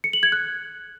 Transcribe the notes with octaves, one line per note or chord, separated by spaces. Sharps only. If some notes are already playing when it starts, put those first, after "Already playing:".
C#7
F#7
G#6
F#6